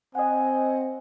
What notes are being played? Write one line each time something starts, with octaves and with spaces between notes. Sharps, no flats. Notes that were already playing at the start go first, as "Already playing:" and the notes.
C4 D#5 F#5 G#5